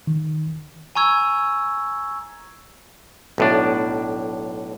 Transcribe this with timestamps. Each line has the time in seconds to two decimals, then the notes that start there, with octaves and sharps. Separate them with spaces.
0.07 D#3
0.95 G#5 A#5 C#6 E6 G#6
3.38 B1 A2 D4